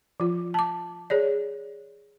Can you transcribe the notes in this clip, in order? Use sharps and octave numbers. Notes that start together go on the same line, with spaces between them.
F3 F4
A5 D6
G#4 C#5 D5